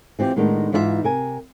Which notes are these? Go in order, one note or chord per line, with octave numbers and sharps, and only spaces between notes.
E3 C4 F4 G4
A2 D#3 G#3 B3 D4 D#4
G#2 E3 D#4 F4 G#4 E5
C3 A#4 G#5